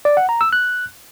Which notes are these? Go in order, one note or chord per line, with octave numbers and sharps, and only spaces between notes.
D5
F#5
A#5
E6
F#6